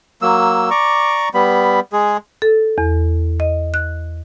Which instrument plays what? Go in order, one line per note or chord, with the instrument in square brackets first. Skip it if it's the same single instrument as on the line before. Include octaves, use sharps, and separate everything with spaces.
[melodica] F#3 A#3 E6
D5 A#5 C#6 D6
G3 B3 B5
G#3 G#4
[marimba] A4
E2
D#5
F#6